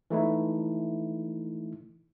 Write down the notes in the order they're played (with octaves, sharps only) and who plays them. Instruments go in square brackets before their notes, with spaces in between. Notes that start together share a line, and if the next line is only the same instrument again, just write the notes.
[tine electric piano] E3 A3 D#4 E4